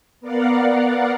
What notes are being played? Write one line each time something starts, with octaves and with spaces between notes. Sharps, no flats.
B3 A#4 D5 F5 F#5